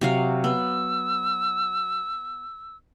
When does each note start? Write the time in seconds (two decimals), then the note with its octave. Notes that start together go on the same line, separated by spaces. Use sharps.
0.01 C3 F#3 F5
0.44 B3 E6